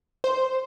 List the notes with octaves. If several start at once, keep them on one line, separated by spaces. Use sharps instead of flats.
C5